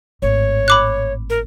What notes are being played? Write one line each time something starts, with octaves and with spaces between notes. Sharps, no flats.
G#1 A2 C#5
B5 D6 F#6
A#4